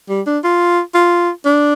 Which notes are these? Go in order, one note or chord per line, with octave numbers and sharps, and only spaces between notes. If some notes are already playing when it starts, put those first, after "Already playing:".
G3
D4
F4
F4
D4